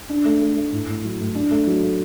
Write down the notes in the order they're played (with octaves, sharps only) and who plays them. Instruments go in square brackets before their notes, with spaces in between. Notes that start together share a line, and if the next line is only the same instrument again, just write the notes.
[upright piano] D4
A3
A3
A3
A2
A2
F#3
A2
D4
A3
F#3
A3